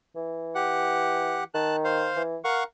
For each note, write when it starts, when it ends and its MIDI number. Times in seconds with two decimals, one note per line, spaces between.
0.16 1.41 52
0.55 1.44 67
0.55 1.44 78
1.54 2.11 51
1.54 1.76 81
1.54 1.76 90
1.84 2.22 72
1.84 2.22 77
2.17 2.37 52
2.44 2.63 70
2.44 2.64 77
2.44 2.64 78
2.44 2.64 85